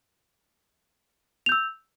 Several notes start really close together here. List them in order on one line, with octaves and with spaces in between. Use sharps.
F7 G6 E6